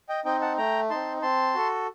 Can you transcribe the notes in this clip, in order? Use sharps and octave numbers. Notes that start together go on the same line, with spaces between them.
D#5 G5
C4 D#4 D#5 G5
F#5 A5
A3 G5 A#5
C4 D#4 A5 C6
C4 A5 C6
F#4 A4